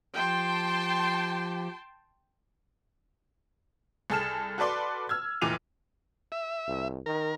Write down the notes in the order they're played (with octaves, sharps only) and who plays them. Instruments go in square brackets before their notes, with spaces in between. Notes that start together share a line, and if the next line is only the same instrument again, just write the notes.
[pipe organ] F3 G4 [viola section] G5 A5 C6
[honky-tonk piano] C2 G#4 A4 A5 F6 E7
F#4 A4 B4 D5 C6
E6 F6 G#6
F1 A#2 E3 D6 D#7 F7
[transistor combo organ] E5
[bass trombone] C2
[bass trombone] D#3 [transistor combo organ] A#4